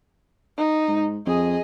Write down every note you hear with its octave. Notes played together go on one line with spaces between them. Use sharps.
D#4
G#2
F2 G#4 D#5